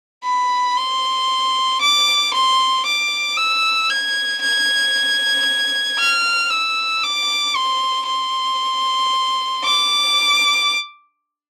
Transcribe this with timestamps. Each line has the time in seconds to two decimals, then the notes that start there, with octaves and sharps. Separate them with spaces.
0.24 B5
0.77 C6
1.82 D6
2.34 C6
2.86 D6
3.38 E6
3.90 G#6
4.42 G#6
5.99 F6
6.51 E6
7.03 D6
7.56 C6
8.07 C6
9.64 D6